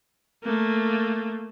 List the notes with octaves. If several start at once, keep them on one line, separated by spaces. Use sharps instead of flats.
A3 A#3